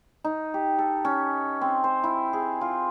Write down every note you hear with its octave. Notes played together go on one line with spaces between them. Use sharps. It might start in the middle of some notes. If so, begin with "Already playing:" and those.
D#4
G4
A4
C#4
C4
C5
E4
G#4
F4